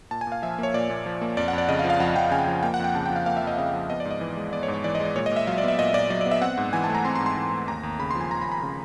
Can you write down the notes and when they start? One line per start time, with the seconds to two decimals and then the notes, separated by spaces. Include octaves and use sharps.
0.11 A#2 A5
0.21 G#5
0.27 A#2 F5
0.42 F3 E5
0.59 A#3 C#5
0.74 A#2 D5
0.90 A#2
1.06 F3
1.22 A#3
1.37 F2 D5
1.48 F#5
1.53 F2
1.58 D5
1.68 C#3 D#5
1.79 F5
1.84 F3
1.90 F5
2.00 F2 F#5
2.16 F2 G5
2.31 C#3 G#5
2.47 F3
2.63 A#3 G5
2.74 F#5
2.79 F2 G5
2.95 C#3 A5
3.06 G5
3.10 F3
3.16 F5
3.26 A#3 F5
3.37 E5
3.42 F2
3.47 D#5
3.58 C#3 D#5
3.73 F3
3.90 B3 D#5
4.00 D5
4.05 G#2
4.11 D#5
4.21 E3
4.37 G#3
4.52 B3 D5
4.63 C#5
4.68 G#2
4.74 C#5
4.84 E3 D5
4.95 D#5
5.00 G#3
5.05 D5
5.16 A#2 C#5
5.26 D#5
5.31 A#2
5.36 E5
5.47 F#3 F5
5.58 D5
5.63 B3 E5
5.79 A#2 D#5
5.94 A#2 D5
6.10 F#3 D5
6.21 D5
6.26 B3
6.31 E5
6.41 C4 F#5
6.58 G#2
6.73 E3 G#5
6.84 A5
6.89 A3
6.95 A#5
7.05 C4 C6
7.15 C6
7.21 G#2
7.26 C6
7.37 E3
7.53 A3
7.68 D#2 A#5
7.83 D#2
7.99 C#3 B5
8.11 C6
8.15 F3
8.21 G#5
8.31 D#2 A#5
8.41 B5
8.46 D#2
8.52 B5
8.63 C#3